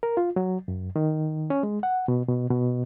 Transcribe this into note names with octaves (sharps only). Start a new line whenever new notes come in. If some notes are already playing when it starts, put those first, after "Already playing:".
A#4
F4
F#3
F#2
D#3
C#4
G#3
F#5
B2
B2
B2